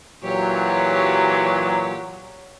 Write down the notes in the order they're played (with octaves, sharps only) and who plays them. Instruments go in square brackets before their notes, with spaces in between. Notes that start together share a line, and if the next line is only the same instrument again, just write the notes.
[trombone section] A#2 E3 F#3 [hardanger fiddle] G4 C#5